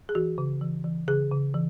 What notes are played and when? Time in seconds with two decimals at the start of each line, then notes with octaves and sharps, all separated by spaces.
0.09 G#4
0.15 E3 F#4
0.38 C#3
0.61 E3
0.84 E3
1.08 C#3 G#4
1.31 C#3
1.54 E3